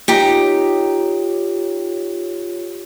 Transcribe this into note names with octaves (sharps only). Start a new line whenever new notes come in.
D#4 F4 G4 C#5 A#5